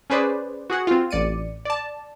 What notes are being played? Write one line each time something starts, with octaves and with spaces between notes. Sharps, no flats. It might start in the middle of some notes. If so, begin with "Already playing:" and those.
C#4 G#4 B4 C5 D5
F#4 G#4 F#5
C4 F4
A1 D5 C#7 D#7
D5 A5